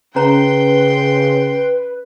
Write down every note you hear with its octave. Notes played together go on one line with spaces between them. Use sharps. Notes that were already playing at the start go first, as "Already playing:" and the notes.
C#3 C#4 B4 G5 A#5 C6